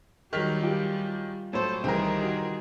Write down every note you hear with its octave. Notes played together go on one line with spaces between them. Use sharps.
D#3 F#3 G3 F6 B6 F7
F4 G4 G#4
A2 F#3 A4 C5 C#5
C2 D#3 E3 G3 C4 G#4 A#4
F#4